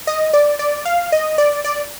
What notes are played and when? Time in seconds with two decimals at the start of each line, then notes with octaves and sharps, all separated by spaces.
0.07 D#5
0.33 D5
0.59 D5
0.85 F5
1.12 D#5
1.38 D5
1.64 D5